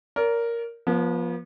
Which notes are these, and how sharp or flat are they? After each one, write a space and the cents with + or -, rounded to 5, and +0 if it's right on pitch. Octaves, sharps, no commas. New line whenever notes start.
A#4 +0 D5 -45
F3 +0 B3 -40